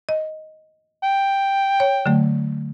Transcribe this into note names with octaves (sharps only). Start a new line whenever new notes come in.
D#5
G5
C#5
D3 F#3 A3